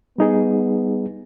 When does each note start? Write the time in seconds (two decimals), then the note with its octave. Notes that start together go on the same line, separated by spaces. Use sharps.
0.18 G3 B3 D#4 G#4